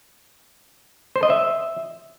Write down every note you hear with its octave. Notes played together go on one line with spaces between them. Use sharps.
C5
D#5
E5